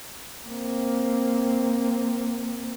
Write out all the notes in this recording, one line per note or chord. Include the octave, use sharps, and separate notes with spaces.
A#3 C4